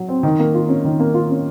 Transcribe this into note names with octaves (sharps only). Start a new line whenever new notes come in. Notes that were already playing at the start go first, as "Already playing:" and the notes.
Already playing: F#3
C4
D#3
A#3
F4
C#4
D#3
A#3
F4
C#4